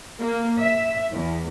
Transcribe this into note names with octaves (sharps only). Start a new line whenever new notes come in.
A#3
E5
E2